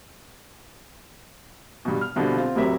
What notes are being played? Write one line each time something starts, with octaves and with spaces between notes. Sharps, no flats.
G2 B2
F6
C2 B2 D3 F3
C4 F4
F1 A2 C3 F#3 A#4 E5